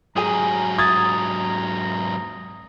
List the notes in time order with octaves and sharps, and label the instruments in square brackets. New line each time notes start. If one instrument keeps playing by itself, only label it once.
[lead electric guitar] G#2 F#3 [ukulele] G#4 G#5 [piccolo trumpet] A#5
[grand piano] D#6 G#6 A6